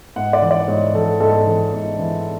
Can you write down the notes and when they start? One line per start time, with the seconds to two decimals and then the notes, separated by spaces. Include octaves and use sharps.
0.16 G#2 F#5
0.33 D5
0.42 E3
0.51 D5
0.68 G#2 C#5
0.94 E3 A4
1.20 G#2 A4
1.47 E3
1.73 G#2
1.99 E3